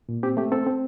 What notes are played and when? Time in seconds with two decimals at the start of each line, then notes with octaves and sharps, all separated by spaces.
0.09 A#2
0.23 C4 G4
0.37 A3 G4
0.51 C4 A4
0.67 C4